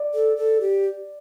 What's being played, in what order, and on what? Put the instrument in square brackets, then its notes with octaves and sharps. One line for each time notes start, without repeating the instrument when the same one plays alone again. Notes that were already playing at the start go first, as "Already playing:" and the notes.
Already playing: [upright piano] D5
[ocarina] A4
A4
G4